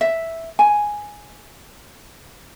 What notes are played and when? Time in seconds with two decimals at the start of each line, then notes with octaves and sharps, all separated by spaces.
0.01 E5
0.59 G#5